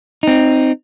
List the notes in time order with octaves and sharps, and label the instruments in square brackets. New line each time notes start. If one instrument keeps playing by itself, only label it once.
[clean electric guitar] C4 D#4